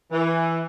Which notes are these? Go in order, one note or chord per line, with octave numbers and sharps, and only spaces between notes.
E3